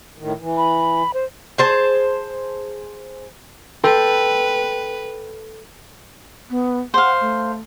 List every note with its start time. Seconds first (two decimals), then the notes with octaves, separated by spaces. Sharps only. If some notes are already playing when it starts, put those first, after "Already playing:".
0.18 A2 D#3
0.39 E3
0.57 B5
1.14 C5
1.58 G#4 C5 A5
3.84 A4 B4 G5 C6
6.50 B3
6.94 C5 F5 F#5
7.21 A3